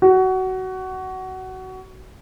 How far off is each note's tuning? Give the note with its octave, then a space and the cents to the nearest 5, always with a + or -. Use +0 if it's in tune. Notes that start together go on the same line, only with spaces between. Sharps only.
F#4 +20